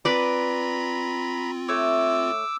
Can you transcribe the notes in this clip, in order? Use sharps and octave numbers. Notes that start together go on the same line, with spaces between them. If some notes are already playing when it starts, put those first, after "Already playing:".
C4 F4 B4 D5 A#5 B5
A3 C#5 D6 E6